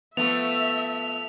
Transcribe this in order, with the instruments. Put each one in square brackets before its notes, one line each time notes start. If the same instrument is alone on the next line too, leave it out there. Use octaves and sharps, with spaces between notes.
[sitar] F3 A3 [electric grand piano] B3 [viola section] E5 [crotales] F7